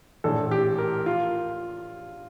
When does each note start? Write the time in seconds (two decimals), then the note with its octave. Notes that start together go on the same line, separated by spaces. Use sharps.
0.24 A#1 A2 E3 A4
0.51 G4
0.78 A#4
1.06 F4